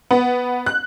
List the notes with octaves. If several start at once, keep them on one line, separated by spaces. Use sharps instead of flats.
B3
F#6